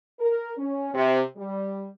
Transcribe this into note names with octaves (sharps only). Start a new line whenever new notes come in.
A#4
C#4
C3
G3